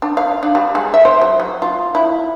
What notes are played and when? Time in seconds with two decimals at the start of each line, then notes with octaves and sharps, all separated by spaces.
0.02 D4
0.17 F5
0.43 D4
0.55 G3
0.75 G#3
0.94 E5
1.05 C5
1.21 F#3
1.40 F#3
1.62 F4
1.95 E4